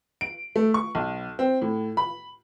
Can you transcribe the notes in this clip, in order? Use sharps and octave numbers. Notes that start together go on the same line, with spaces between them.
D7
A3
C#6
B1
C4
A2
B5